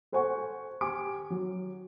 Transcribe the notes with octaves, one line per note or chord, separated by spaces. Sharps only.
A4 C5 F#5 G#5 C#6
G4 G#5 D6 D7
F#3